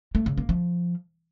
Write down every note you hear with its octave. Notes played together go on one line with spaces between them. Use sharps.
A3
C#3
A#3
F3